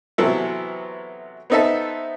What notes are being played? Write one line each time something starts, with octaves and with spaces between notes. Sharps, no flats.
C3 E3 F#3 B3 E4 A4
B3 C4 D#4 A4 E5 A5